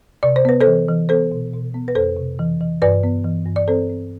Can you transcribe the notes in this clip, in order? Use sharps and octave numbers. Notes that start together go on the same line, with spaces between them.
C3 D5
C5
B3 B4
A4 C5
E3
E3
B3 A4 C5
B2
B2
B3
B4
F2 A4 C5
C3
E3
E3
G2 B4 D5
B3
E3
G2
D5
C4 A4 C5
C4